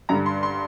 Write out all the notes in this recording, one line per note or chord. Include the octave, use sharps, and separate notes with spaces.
G2 D3 G3 A#5
C6
C6